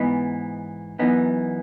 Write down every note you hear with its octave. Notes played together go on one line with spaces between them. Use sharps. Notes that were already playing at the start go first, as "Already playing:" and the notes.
Already playing: G#2 E3 B3 D#4
F#2 E3 B3 D#4